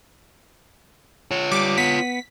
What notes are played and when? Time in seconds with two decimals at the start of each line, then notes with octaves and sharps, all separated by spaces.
1.31 F4 C#5
1.52 G3 D6
1.78 B3 B6